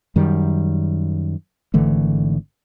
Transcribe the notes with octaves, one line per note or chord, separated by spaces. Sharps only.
F#2 D#3 G3
G#1 D3 E3 A3